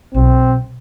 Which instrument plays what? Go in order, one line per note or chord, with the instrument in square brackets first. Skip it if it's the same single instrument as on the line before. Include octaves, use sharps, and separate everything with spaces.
[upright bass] B1 [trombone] C4